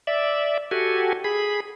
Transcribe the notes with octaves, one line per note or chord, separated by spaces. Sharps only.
D5 E5
F#4 G4 A4 G#5
G#4 B5